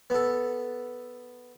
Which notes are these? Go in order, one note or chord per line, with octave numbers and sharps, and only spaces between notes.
B3 A4